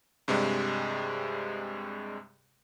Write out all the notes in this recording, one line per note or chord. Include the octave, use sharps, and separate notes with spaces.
G2 C3 G3 G#3